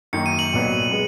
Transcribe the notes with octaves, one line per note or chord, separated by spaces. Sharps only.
F#2 D#3 A#3 D#4 C#7
D#7
F#7
B1 A#2 F#3 B3
G#3 B3